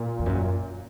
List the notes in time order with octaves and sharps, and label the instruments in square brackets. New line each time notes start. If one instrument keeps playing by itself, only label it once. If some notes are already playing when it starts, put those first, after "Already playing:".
Already playing: [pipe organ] A#2
[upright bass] E2
F#2